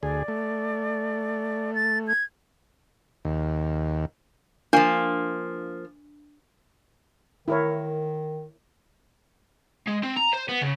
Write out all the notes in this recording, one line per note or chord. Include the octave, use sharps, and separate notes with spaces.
D2 G#4 D5
A3
A6
G#6
D#2
F3 A#3 D4
D#3 E4 A#4 C#5
G#3
C4
A#5
C5
B3
C#3